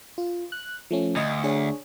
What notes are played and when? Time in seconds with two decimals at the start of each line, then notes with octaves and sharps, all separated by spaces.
0.18 F4
0.52 F#6
0.91 F3 A3 C#4
1.16 D2 D#5
1.44 D4 G#4 C#5